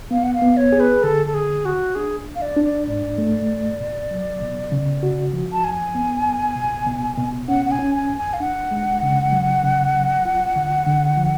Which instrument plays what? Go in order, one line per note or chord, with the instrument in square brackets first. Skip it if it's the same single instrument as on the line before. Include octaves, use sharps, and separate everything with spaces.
[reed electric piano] B3 [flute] F5
[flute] F#5
F5
[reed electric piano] B3
[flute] C#5
[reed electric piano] G#4
[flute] B4
[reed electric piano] D3 [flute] A4
[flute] A4
[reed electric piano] D2 [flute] G#4
[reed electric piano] D2 [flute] F#4
[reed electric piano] D4 [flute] G#4
[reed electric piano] C#2
[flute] F5
D5
[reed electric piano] D4
[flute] D5
[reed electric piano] G#2 [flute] D5
[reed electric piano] A3
G#2
B2
F#3
B2
C#3
F#4
F3
[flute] A5
[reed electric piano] F#2 [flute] G#5
[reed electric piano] B3
F#2
B2
B2
B2
[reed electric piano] C#4 [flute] F#5
[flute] F#5
G#5
[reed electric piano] C#4
[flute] G#5
[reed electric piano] F2
[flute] G#5
F5
[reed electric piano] D4 [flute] F#5
[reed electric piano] G#3
C#3
F#3
C#3
F#3
F4
D3
D3
F3